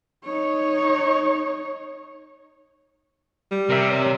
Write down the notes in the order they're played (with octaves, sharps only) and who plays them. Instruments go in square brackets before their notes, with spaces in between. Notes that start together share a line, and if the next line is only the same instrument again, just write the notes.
[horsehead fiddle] D#4 C#5
[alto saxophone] G3
[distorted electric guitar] C3 [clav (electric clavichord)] A#4 E5
[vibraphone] C#5 E6